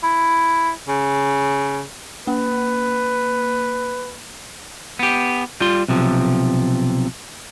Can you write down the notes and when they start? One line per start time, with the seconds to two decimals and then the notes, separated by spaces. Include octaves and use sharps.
0.03 E4
0.88 C#3
2.27 A#3 B4
4.99 B3 G4
5.60 G3 F4 C6
5.88 B1 C3 F3